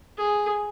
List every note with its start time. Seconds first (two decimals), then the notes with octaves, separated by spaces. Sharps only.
0.17 G#4